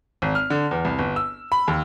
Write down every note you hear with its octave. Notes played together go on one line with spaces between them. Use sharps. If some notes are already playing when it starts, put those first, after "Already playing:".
G#1
F6
D3
E2
C2
G1
E6
B5
D#2